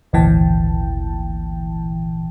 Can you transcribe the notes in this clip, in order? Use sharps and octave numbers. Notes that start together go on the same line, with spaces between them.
G#1 D2 A#2 E3 G5 A5